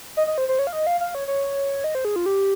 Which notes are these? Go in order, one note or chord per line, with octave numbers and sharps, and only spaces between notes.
D#5
D#5
C5
C5
C#5
F5
D#5
F5
F5
C#5
C#5
D#5
C5
G#4
F4
G4